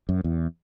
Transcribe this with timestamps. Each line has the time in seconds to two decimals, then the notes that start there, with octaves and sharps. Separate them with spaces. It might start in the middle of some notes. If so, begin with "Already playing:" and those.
0.09 F#2
0.24 E2